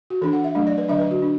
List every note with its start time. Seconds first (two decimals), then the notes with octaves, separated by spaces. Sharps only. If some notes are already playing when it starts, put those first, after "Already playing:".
0.10 F#4
0.22 E3 D4 A4
0.33 F#5
0.44 E5
0.55 F#3 A3 D4
0.67 D5
0.78 B4
0.88 D3 F#3 D4 E5
1.00 B4
1.11 F#4
1.22 D4